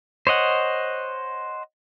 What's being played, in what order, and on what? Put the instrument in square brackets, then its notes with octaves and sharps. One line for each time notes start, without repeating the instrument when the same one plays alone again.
[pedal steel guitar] C5 C#5 D#5 F#5